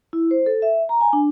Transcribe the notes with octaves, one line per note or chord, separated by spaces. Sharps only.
E4
C5
A4
E5
A#5
G#5
D4